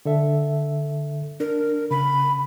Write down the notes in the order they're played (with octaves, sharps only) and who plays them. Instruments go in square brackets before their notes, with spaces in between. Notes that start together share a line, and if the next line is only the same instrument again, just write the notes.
[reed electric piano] D3 A4 E5
[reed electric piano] D4 [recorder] A#4
[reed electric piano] C#3 [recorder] B5